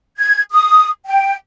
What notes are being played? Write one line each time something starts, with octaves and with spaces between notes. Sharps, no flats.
G#6
D#6
G5